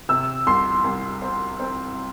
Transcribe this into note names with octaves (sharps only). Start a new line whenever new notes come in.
C3 E6
C2 C6
C2
C4
C4